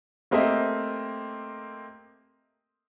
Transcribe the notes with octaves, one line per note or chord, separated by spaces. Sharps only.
A3 A#3 C4 G4 D#5 E5